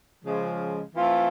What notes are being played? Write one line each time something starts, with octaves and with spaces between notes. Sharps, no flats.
C#3 F3 G#3
E3 A3 C4 F4